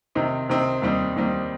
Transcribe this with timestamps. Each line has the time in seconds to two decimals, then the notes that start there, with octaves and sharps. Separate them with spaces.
0.15 C3 D#3 C4 D#4
0.49 C3 D#3 C4 D#4
0.82 D#2 D#3 G3 C4 D#4
1.16 D#2 D#3 G3 C4 D#4